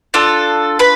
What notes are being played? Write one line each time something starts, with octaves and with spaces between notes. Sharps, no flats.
D4 F4 A4
B4 B5